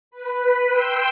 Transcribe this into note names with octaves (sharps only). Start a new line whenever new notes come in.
B4
G5 C6 E6 G6